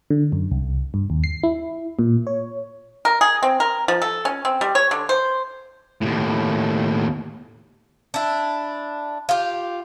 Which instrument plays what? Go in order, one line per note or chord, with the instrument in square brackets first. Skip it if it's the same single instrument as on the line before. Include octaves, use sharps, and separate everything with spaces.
[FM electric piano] D3
F#2
C2
G2
D#2
C7
E4
A#2
C#5
[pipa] A#4
G#4
C4
A#4
F3
A4
C#4
C4
G3
C#5
D3
C5
[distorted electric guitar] D#2 A2
[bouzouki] D4 E4
F4 G4